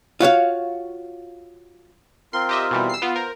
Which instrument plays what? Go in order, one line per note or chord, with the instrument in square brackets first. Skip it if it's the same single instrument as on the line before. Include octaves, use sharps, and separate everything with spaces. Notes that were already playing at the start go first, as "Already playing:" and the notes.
[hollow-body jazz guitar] F4 F#4 C#5 F5
[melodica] C4 F4 A#4 [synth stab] C6
[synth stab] G4 D#5 E5
B2 E3 G3
E6 C7
B3 F4
[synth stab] A#4 [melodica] C5